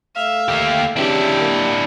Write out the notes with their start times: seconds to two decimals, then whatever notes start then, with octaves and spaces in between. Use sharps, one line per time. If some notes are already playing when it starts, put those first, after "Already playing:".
0.16 A3 E5 F5
0.48 A#3 G4
0.96 C#3 E3 D4 E4 G4
1.40 A#3